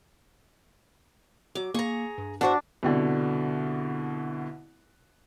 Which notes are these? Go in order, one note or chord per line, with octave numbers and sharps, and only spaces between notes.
F#3 D6
A#3 G#4 A#5 C#6
G2
E2 D4 F#4 C5 E5 F#5
C2 B2 D3